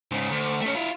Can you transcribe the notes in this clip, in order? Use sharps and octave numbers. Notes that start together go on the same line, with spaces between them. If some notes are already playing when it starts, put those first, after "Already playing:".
G#2 C#3
D2
A3 C#4
E4 F4